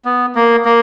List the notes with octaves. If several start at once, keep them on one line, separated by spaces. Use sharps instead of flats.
B3
A#3
A#3